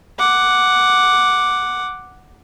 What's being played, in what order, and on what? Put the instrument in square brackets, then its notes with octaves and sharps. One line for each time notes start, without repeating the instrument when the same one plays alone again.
[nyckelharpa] F#5 D6